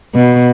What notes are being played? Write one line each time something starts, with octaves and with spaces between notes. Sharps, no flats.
B2